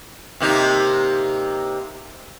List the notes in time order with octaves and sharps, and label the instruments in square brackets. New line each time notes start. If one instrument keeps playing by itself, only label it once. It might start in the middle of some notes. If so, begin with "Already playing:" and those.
[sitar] C3 A#3 D#4